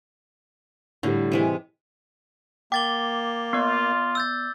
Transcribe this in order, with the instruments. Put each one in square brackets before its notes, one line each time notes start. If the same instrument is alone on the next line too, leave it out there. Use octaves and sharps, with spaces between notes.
[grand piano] A2 G3 [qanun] D3
[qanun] C3 E3 G#3
[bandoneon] A#3 [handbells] G5 [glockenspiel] D6 A6 G7
[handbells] B3 D5 [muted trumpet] F4
[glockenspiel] E6 G6 A6